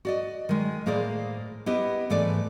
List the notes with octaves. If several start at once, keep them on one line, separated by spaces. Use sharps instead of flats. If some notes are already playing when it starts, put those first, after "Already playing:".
F#4 D5 D#5
D#3 G#3
A2 A#3 G#4 C5 D5
B3 E4 G4 D#5
G#2 E3 A3 D5